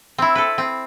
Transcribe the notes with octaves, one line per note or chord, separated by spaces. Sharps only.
C4 E4
A4 B4
C4